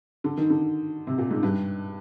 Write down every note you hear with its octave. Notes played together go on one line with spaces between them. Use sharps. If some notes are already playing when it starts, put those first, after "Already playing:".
D3
D#3
D3
C3
A#2
G#2
G2